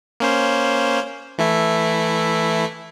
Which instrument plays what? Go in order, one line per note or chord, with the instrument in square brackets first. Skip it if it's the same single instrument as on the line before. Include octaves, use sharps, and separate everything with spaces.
[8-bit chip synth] A#3 C#4 C5
E3 A3 E4